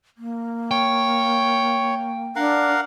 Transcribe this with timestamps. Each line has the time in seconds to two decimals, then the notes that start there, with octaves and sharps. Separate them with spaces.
0.18 A#3
0.71 C#5 G5
2.36 D4 A#4 F5 F#5